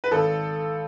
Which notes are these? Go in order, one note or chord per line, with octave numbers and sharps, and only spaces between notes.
B4
G#1 A4